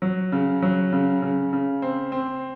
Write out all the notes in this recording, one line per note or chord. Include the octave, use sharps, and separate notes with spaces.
F#3
C#3
F#3
C#3
C#3
C#3
C4
C4